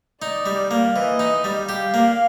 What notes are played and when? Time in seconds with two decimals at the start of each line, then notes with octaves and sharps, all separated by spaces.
0.22 D#4 D5
0.46 G3
0.71 A#3
0.95 E3 D#5
1.19 D#4
1.44 G3
1.69 G4 F5
1.94 A#3